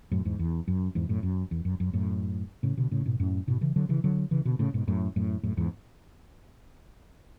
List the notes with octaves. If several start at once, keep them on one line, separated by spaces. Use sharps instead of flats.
F#2 A2
E2 G#2
E2
F#2
E2 G#2
F#2 A2
F#2
E2
F#2
F#2
F#2 A2
A2 C#3
B2 D3
A2 C#3
G#2 B2
F#2 A2
G#2 B2
C#3 E3
D3 F#3
C#3 E3
D3 F#3
C#3 E3
B2 D3
A2 C#3
G#2 B2
F#2 A2
F#2 A2
F#2 A2
E2 G#2